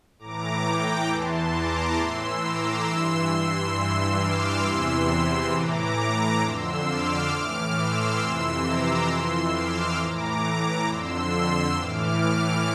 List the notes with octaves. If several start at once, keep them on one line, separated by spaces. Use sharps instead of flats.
A2 E3 A#5 D6
G5 A#5
E2 E3 A5 C6
A#5 D6
A2 E3 C6 E6
A#5 D6
G2 E3 C6 E6
C6 E6
G2 E3 C6 E6
D6 F6
E2 C3 E3 C6 E6
A2 E3 A#5 D6
A#5 D6
F2 D3 C6 E6
D6 F6
A2 E3 D6 F6
C6 E6
F2 C3 E3
A#5 D6
F2 E3 C6 E6
D6 F6
A2 E3 A#5 D6
A#5 D6
F2 D3 C6 E6
C6 E6
A2 E3 D6 F6
D6 F6